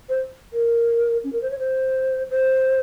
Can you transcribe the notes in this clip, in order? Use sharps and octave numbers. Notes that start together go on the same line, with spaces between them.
C5
A#4
C#4
A#4
C5
C#5
C5
C5